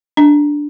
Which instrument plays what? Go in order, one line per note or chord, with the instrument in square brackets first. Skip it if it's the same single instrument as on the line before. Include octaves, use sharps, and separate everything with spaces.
[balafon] D4